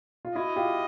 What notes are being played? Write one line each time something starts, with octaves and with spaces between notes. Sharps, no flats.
F4
E4 F#4 D#5
F4 G4